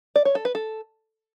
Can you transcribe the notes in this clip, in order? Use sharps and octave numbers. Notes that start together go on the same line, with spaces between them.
D5
C#5
A4
B4
A4